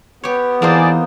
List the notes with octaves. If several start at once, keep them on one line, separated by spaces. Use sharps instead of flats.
B3 G4 C#5
E3 A#3 D#4 G#4 C5 D5 A5